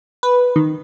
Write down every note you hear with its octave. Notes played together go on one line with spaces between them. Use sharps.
B4
D#3